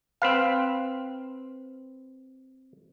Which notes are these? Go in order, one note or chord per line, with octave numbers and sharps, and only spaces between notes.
C4 B4 F5